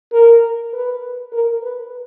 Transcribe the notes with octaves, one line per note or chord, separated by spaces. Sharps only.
A#4
B4
A#4
B4